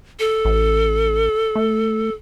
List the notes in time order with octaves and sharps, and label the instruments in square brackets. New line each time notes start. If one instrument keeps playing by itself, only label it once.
[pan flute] A4
[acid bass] A1
A3